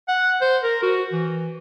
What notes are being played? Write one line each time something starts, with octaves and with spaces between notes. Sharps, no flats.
F#5
C5
A#4
F#4
E3